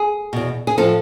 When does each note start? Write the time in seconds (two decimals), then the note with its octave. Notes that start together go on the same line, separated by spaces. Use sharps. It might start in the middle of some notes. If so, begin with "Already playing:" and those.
Already playing: G#4
0.33 E2 B2
0.67 G#4
0.77 A2 F3 A4